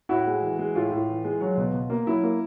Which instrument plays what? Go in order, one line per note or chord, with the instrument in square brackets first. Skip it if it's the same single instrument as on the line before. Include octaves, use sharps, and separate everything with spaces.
[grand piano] A2 E4 F#4
G#3
E3
G#3
A2 F4
A2
E3
G#3
F#3
B2
B2
A#3
F#3 E4
A#3